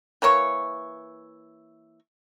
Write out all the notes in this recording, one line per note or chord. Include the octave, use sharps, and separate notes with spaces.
E3 A#3 C#5 C#6